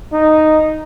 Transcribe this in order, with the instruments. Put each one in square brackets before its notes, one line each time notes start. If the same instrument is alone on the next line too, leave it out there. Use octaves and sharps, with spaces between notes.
[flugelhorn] D#4